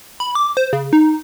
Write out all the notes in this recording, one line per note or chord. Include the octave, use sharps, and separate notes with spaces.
B5
D6
C5
C#3
D#4